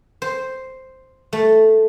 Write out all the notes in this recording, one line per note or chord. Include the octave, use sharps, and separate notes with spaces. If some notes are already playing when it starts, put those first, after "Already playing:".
C5
A3